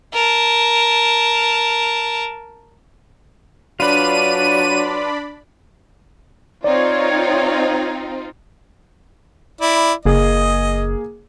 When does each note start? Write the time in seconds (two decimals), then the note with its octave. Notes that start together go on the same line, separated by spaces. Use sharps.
0.14 A#4 A5
3.80 F#3 D4 F4 B4 D5 B5 D#7
6.64 C4 D#4 F4 C#5 D5
9.61 E4 D5
10.05 F#1 A#3 G#4 D#5